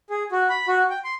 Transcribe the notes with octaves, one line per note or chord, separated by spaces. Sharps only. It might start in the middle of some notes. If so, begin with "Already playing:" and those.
G#4
F#4
B5
F#4
G5
C6